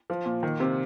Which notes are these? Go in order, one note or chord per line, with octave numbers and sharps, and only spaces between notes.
F3
A#2
D#3
C3